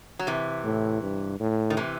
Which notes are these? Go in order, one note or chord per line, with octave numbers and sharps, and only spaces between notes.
F#3
C3 E3
A2
G2
A2
D#3
C3 E3